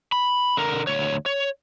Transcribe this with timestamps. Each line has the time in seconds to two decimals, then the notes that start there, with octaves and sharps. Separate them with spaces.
0.12 B5
0.57 D3 A#4
0.87 D2 C#5
1.26 C#5